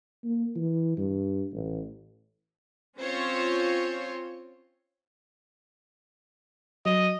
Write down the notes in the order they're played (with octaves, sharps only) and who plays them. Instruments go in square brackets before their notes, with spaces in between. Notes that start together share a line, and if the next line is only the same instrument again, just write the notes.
[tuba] A#3
E3
G2
A1
[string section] C4 C#4 F4 C5 C#5
[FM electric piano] F#3 [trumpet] D#5